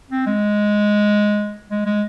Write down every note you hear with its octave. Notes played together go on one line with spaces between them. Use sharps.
C4
G#3
G#3
G#3